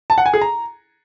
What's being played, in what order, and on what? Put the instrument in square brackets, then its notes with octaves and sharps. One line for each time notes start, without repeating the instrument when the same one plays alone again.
[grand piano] A5
F#5
G#5
G#4
A#5